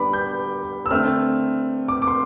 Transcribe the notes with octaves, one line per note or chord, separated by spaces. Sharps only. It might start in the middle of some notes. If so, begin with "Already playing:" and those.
Already playing: D3 G3 B3 D4 B5 D6
G6
E6
D3 A3 C4 F6
D6
D6
C6